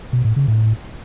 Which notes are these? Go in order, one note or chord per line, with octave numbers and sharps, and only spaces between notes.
B2
A2
C#3
A2